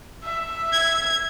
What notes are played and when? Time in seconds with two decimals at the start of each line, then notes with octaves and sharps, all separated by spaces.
0.24 E5
0.72 G#6